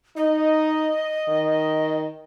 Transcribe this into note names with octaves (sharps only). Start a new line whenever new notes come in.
D#4 D#5
D#3